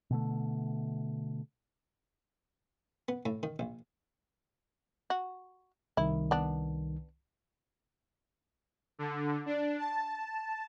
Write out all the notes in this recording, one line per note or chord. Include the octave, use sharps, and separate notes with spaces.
B2 D3 A3
B3
A2
D#3
A#1
F#4
C2 D#3 E4
B3 D4
D3
D4
A5